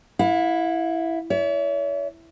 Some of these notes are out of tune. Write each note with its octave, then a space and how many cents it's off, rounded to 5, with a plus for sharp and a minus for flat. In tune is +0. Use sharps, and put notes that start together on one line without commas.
E4 +0 F5 +45
C#5 +45 E5 +0